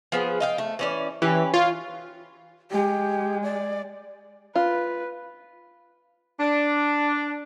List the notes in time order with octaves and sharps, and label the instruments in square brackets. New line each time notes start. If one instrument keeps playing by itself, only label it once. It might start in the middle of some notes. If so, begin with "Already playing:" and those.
[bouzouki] F3 B3 G#4
D#5 F5 G5
A3
E3 C#4 D5
[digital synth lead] E3 [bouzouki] C#4 G4 B4
[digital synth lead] F4 [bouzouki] C#5
[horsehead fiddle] G#3 [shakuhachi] G4
[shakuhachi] D5
[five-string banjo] F4 [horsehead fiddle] B4
[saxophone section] D4